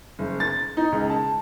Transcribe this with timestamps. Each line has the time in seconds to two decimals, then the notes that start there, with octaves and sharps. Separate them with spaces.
0.19 F#1
0.40 A6
0.77 D#4
0.92 C#2
1.10 A5